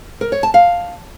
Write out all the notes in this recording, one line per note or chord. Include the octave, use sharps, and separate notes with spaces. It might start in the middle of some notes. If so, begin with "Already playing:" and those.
A#4
C#5
A5
F5